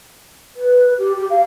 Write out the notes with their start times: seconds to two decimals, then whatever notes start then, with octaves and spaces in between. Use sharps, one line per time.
0.56 B4
0.98 G4
1.17 G4
1.30 F5